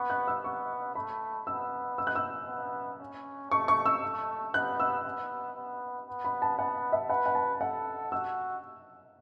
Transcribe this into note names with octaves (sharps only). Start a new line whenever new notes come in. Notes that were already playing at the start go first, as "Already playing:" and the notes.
Already playing: B3 C#6
F#6
E6
B3 C#6
A3 B5
B3 E6
E6
F#6
E6
B3
C#4
A3 C#6
C#6
E6
A3
B3 F#6
E6
B3
B3
B3
B5
A5
B3 F#5
E5
B4 F#5
F#5
A5
A4 F#5
F#4 E6